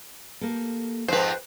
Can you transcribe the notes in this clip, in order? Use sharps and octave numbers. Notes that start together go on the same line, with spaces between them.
A#3 G4 A4
F2 G#2 F3 B4 C5